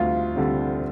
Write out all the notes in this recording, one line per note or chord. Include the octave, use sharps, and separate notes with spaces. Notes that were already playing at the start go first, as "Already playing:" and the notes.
Already playing: D2 D3 G3 C4 F4
D3 G3 C4